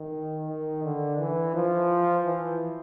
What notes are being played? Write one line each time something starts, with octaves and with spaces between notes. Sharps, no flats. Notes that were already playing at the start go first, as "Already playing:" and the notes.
Already playing: D#3
D#3
D3
E3
F3
E3